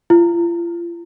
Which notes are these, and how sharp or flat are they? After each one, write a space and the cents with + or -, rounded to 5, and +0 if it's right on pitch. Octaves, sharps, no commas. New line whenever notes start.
F4 -40